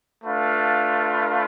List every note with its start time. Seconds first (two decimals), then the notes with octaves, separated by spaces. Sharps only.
0.23 A3 D4 F4 B4 F5